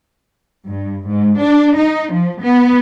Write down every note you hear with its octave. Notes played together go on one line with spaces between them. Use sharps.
G2
G#2
D4
D#4
F3
B3